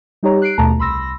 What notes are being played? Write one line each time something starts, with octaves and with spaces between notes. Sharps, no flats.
G3 D#4 G4 C#5 A#5
F#6 C7 D7
D#2 B2 A3 A5 A#5
C2 B5 C6 E6 A#6